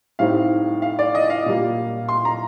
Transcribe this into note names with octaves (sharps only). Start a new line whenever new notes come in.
A2 G3 C4 D#4 F5
F5
D5
D#5
F5
A#2 G3 A#3
C6
A#5